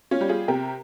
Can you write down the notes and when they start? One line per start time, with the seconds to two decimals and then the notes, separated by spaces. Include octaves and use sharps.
0.11 C#4 F4
0.21 G3
0.29 F4 G#4
0.48 C3 G4 A#4